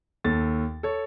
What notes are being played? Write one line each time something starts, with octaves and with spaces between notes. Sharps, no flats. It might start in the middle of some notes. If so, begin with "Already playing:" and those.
D#2 A4 A6
A4 C#5